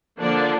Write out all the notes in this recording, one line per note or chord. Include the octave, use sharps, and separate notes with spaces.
D3 F3 A#3 D4 D5